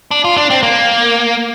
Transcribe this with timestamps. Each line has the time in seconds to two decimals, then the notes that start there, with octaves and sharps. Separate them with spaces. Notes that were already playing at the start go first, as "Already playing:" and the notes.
0.11 D4
0.25 F4
0.37 D4
0.50 C4
0.63 A#3